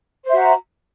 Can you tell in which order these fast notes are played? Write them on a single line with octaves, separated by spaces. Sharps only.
C5 E5 F#4 A#5